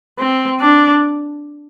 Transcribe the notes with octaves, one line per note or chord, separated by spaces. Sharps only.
C4
D4